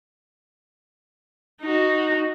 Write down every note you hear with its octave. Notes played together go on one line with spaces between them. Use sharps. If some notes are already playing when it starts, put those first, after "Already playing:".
D#4 F#4